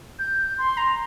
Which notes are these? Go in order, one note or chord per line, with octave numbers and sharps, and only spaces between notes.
G6
C6
A#5